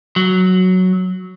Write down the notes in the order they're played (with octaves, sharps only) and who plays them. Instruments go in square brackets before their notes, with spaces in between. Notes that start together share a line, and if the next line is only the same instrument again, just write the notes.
[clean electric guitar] F#3